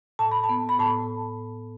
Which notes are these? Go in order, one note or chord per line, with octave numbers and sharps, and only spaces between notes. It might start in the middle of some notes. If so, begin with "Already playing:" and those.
A2 A5
B5
A5
B3
B5
A2 A5